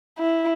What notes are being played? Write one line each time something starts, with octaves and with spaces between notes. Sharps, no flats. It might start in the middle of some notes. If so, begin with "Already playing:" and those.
E4